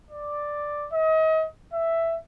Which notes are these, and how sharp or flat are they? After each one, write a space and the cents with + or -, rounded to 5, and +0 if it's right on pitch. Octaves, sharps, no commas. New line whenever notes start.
D5 +5
D#5 +35
E5 +5